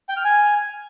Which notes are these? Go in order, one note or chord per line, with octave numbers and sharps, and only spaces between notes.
G5
F6
G#5